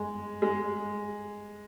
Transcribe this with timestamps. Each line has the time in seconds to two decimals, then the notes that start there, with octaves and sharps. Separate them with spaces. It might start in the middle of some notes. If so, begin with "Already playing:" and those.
Already playing: G#3
0.42 G#3